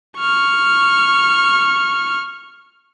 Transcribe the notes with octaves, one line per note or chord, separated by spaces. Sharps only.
C#6 F6